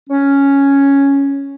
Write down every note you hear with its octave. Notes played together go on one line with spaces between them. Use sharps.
C#4